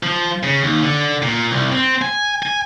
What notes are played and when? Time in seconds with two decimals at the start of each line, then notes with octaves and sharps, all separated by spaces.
0.03 F3
0.43 C#3
0.64 D#2
0.82 D3
1.22 A#2
1.51 C2
1.72 C4
2.02 G#5
2.43 G#5